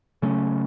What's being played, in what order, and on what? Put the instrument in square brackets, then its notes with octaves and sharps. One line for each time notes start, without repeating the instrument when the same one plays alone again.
[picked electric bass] C#3 F#3 A3 C#4